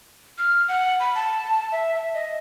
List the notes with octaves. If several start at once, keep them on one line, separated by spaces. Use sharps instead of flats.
F6
F#5
B5
A5
E5
E5
D#5